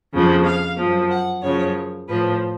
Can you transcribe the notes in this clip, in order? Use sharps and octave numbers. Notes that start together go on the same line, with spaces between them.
F2 C#3 F3
F5
F#2 F3
F#5
F#2 C#3 F3 C#5
A2 F3 B4